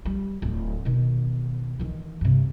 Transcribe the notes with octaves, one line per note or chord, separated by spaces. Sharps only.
G3
D1
B2 D#3
D#3 E3
G2 C3